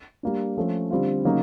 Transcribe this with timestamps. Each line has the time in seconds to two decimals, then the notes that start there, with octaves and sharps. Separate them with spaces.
0.23 G3 A#3 D4
0.57 F3 A3 C#4
0.91 D3 G3 C4 F4
1.25 C#3 F#3 A#3 D#4